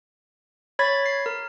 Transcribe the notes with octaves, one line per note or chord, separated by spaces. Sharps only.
C#5 B5 G#6 A6 B6
C7
A#4